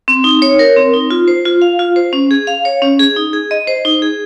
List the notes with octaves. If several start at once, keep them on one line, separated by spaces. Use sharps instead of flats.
C4
D#4
C#5
A#4
C4
D#4
F4
C5
F4
F5
F4
C5
C#4
G#4
F5
C#5
C#4
G#4
D#4
G#4
D#5
C5
D#4
G#4